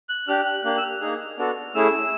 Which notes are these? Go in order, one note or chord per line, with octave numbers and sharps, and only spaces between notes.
F#6
D4 G4 F6
F#6
A#3 D4 G4 F#6
E6
F6
A#3 D#4 G#4
B3 D4 F#4 A4
A3 C#4 E4 G#4 E6